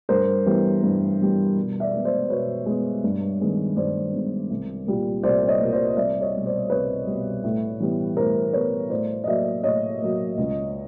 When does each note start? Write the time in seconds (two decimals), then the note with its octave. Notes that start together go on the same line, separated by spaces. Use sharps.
0.09 G2 A#4 C5
0.46 E3 G3 B3
0.83 G2
1.20 E3 G3 B3
1.56 B2
1.80 D5 E5
1.93 G#3 B3
2.05 C5 D5
2.30 B2 B4 C#5
2.66 G#3 B3
3.04 G2
3.40 D#3 G#3 B3
3.76 G2 C5 D5
4.13 D#3 G#3 B3
4.51 C2
4.86 A#2 G3 A#3
5.23 C2 C5 D5
5.48 C#5 D#5
5.61 A#2 G3 A#3
5.72 C5 D5
5.97 C2 D5 E5
6.21 C#5 D#5
6.34 B2 G3
6.46 C5 D5
6.70 C2 B4 C#5
7.07 B2 G3
7.44 A2
7.80 E3 G3 B3
8.17 A2 A#4 C5
8.53 E3 G3 B3 B4 C#5
8.90 A2 C5 D5
9.24 D#5
9.27 F#3 A#3 D5 E5
9.63 A2 C#5 D#5
10.01 F#3 A#3
10.38 C#2